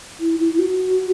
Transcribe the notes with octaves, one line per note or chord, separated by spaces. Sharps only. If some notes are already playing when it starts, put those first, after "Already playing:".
E4
E4
E4
F#4